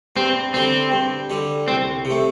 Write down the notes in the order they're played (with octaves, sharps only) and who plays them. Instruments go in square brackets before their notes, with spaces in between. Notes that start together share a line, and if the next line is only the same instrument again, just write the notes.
[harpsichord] G2 [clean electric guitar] C4
[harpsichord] D3 G3 [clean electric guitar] C4
[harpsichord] G2
D3 G3
[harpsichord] C2 [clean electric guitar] C4
[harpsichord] C3 A3